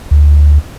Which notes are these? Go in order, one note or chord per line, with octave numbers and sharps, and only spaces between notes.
D2